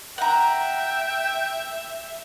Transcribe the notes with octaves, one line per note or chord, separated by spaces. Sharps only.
E5 F#5 G5 A#5